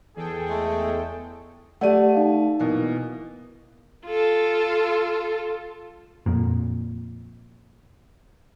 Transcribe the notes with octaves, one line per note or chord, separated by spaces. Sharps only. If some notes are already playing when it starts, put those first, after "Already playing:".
E2 G#4 A4 G5
G#3 A3
A3 G4 D5 F#5 D#7
D#4 F5
B2 E3 A#3
F4 A4
F2 A#2